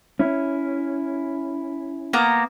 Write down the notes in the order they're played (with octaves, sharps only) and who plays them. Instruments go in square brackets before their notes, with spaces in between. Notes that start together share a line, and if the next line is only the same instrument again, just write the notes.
[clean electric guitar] C#4 E4
[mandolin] A#3 B3 A#5